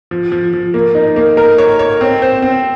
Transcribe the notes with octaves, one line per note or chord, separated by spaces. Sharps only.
F3
F3
F3
A#3
D#4
A#3
A#4
C#5
C#5
C4
C5
C4